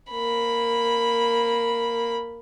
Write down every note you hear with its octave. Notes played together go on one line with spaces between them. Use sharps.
A#3 B5